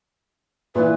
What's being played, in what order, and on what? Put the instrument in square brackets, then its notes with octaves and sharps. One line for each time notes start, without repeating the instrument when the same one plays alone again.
[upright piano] A#2 E3 [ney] B4